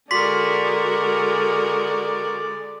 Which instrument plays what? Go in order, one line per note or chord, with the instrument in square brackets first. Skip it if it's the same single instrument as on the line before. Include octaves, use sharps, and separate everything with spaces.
[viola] D3 G#3 [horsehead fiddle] F#4 A#4 [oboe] D5 [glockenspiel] C6 B6